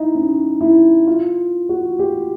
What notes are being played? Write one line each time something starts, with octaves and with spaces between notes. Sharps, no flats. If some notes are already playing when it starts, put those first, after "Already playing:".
Already playing: D#4 E4
C#4
E4
F4
F#4
G4